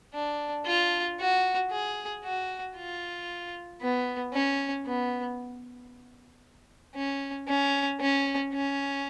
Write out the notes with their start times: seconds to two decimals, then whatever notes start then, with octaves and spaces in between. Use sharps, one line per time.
0.14 D4
0.66 F4
1.20 F#4
1.71 G#4
2.24 F#4
2.76 F4
3.81 B3
4.33 C#4
4.86 B3
6.95 C#4
7.48 C#4
8.00 C#4
8.53 C#4